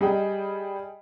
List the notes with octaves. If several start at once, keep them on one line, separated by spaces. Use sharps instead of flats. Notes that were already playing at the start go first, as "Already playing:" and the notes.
G3 G#4 D#5 G5